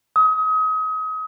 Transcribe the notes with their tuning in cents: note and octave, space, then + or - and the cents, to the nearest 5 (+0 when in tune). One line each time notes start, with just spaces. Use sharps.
D#6 +35